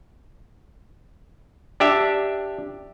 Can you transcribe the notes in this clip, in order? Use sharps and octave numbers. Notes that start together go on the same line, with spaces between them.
D4 G4 E5